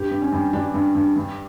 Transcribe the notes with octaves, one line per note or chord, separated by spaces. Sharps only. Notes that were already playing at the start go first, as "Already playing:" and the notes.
Already playing: G2 G4
G2
C#4
G2
G2 D4
G2
G2
G2